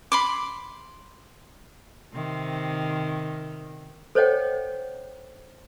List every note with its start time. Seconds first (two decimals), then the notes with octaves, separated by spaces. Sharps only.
0.12 B5 C6 D6
2.13 C3 D#3
4.15 A4 C5 C#5 D#5 F#5 G5